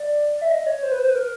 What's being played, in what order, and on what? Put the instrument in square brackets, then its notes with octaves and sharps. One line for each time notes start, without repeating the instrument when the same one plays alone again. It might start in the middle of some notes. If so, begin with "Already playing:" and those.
Already playing: [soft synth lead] D5
E5
D#5
C#5
C5
B4
C5
B4
A#4